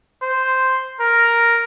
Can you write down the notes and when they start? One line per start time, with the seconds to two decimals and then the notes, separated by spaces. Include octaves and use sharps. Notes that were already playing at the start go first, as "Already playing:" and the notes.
0.23 C5
1.01 A#4